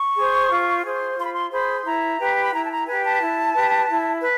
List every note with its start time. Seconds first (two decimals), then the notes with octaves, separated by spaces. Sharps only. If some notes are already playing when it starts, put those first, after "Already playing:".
Already playing: C#6
0.15 G#4 C5
0.50 F4
0.84 G#4 C5
1.17 F4 C6
1.25 B5
1.33 C6
1.51 G#4 C5 B5
1.85 E4 A#5
2.19 G4 B4
2.42 B5
2.52 E4 A#5
2.65 A5
2.70 A#5
2.87 G4 B4 G#5
3.03 A5
3.21 E4
3.54 G4 B4
3.88 E4
4.22 B4